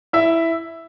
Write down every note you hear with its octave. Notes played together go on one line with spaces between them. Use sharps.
E4 E5